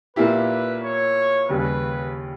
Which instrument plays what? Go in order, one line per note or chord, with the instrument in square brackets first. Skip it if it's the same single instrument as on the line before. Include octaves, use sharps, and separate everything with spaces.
[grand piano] A#2 A#3 E4 G4 [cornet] B4
[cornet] C#5
[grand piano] D#2 C#3 G3 C#4 [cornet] B4